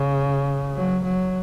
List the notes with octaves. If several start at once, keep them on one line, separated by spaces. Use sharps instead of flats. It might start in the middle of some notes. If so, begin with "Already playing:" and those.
Already playing: C#3
F#3
F#3